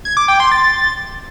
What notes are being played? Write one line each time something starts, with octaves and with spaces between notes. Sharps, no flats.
G#6
D6
G5
C6
A6